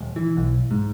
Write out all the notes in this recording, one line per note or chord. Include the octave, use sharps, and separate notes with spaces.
D#1
E3
B1
G#2